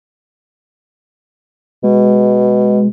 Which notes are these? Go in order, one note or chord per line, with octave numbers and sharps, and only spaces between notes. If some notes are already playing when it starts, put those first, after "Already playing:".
B2 G#3